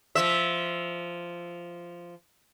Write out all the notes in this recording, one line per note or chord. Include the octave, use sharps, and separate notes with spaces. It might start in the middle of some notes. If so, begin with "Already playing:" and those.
F3 E5